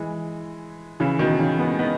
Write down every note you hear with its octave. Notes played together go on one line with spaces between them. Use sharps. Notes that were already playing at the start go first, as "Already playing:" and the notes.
Already playing: E3 G#3
C#3 E3
B2 D#3
C#3 E3
G#3 B3
B3 D#4